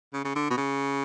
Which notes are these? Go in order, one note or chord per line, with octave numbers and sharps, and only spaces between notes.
C#3
C#3
D3
B2
C#3